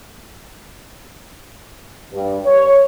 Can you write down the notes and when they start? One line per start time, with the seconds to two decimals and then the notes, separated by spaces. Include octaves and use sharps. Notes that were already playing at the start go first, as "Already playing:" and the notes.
2.14 G2
2.46 C#5